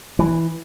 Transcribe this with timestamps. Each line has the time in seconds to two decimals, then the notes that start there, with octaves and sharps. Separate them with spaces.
0.19 E3